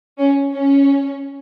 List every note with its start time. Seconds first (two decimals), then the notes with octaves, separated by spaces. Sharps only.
0.19 C#4
0.55 C#4